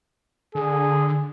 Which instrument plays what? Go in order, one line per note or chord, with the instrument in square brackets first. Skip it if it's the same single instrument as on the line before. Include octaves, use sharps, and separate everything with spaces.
[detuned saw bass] D3 [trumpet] G#4